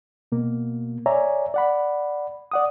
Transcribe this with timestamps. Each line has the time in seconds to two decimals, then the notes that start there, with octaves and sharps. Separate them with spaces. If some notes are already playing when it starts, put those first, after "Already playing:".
0.32 B2 A#3
1.06 C#5 D5 E5 G#5 A#5
1.54 D5 F#5 B5
2.51 D5 F#5 D#6